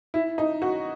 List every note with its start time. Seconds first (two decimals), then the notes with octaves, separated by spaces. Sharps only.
0.14 E4
0.38 D#4
0.62 F#4